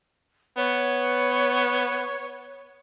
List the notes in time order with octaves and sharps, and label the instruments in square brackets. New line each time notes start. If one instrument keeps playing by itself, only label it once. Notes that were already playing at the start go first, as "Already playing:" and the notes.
[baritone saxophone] B3 [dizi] C#5